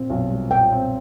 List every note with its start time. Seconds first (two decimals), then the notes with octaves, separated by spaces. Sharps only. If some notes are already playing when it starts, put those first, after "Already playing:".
Already playing: A#2 C4
0.10 B1
0.30 G3
0.51 A#2 G5
0.72 C4